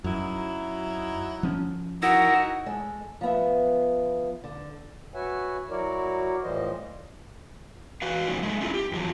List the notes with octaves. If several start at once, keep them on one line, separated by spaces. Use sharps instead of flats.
F#2 F#3 D#4 E4
F3 C4 C#4
D#4 E4 F#4 A#4 F#5
G#3 A4
F3 B3 E5
D3
F#4 B4 C#5 E5 F#5 G#5
F#3 E4 F#4 A#4 C#5 D5
A2 E3 F3 G3 C5 D#5
F#4 B4 F5
F3 A#3 C#4 D#4 D5
G#3 A3
C#4 E4 F4
G4
E2 F3 F#3